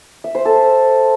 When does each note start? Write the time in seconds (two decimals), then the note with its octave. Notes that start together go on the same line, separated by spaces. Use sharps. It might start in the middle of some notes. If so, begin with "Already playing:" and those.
0.24 E5
0.35 C5
0.45 A4